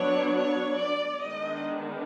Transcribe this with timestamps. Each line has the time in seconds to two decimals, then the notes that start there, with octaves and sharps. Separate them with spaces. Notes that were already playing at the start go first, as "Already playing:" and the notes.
Already playing: F#3 B3 D4 C#5
0.36 C#5
0.80 D5
1.26 D#3 G#3 B3 D4 D#5